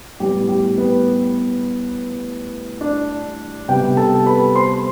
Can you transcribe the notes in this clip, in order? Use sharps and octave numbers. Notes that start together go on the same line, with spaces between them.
A2 G3 B3 G4
G4
B3 B4
D4 D5
C3 G3 B3 G4 G5
A4 A5
B4 B5
C5 C6